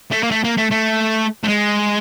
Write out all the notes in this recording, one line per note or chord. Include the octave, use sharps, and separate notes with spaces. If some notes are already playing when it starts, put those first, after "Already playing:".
A3
A#3
A3
A#3
A3
A3
A3
G#3